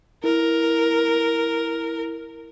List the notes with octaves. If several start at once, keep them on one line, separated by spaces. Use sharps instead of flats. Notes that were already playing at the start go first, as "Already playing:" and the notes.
E4 A#4